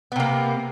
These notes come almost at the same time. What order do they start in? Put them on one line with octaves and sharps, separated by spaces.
B3 C3 A#3